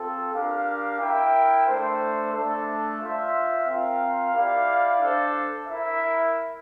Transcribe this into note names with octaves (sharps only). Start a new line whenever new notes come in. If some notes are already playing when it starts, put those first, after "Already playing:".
Already playing: C4 F4 A4
D4 G4 A#4 F5
E4 A#4 E5 G5
A3 D4 A4 C5
A3 D4 A4
F4 C5 E5
C4 F4 A#4 F5
E4 G4 D5 F5
D4 A4 C5
E4 A#4 E5